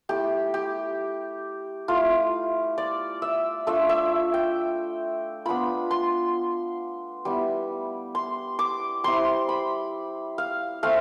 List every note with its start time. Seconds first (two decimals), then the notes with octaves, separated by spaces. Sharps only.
0.09 A3 E4 G4
0.54 G4
1.88 A3 E4 F4
2.78 D5
3.22 E5
3.67 A3 D4 F4 E5
3.89 E5
4.34 G5
5.45 B3 D4 F4 B5
5.91 C6
7.25 G3 B3 E4
8.15 C6
8.59 D6
9.04 G3 C4 E4 C6
9.49 B5
10.38 F5
10.83 A3 C4 F5